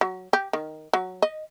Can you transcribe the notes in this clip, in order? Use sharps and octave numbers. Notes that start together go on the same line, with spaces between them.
F#3
G4
D#3
F#3
D#5